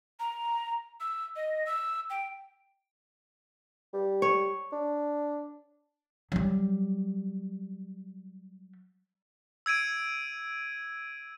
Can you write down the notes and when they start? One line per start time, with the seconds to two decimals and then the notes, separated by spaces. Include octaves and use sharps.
0.20 A#5
1.00 E6
1.36 D#5
1.66 E6
2.10 G5
3.93 G3
4.22 C#5
4.72 D4
6.32 F#3 G3
9.66 E6 G#6 D7 D#7